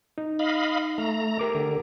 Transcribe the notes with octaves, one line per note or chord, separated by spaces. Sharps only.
D#4
D#5 F5 B5
A3 A#5
G4 A#4 D6
D3